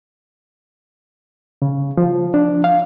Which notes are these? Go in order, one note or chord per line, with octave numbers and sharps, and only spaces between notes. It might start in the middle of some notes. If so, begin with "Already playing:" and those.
C#3
F3
D4
F5